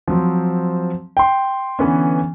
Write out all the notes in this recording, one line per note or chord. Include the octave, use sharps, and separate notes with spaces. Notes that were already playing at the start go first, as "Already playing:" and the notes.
F3 F#3 C4
G5 C6
D3 E3 B3 C#4